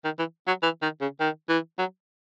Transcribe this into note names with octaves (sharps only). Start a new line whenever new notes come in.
D#3
E3
F#3
E3
D#3
C#3
D#3
E3
F#3